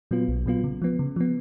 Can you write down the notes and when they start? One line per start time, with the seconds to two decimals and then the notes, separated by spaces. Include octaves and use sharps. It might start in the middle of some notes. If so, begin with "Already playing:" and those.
0.11 A#2 F#3 B3 F4
0.28 B1
0.46 A#2 F#3 B3 F4
0.64 C#3
0.82 F3 B3
0.99 C#3
1.16 F3 B3